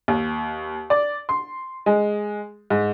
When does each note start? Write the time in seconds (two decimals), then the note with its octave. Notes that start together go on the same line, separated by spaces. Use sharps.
0.08 D#2
0.90 D5
1.29 C6
1.86 G#3
2.70 G#2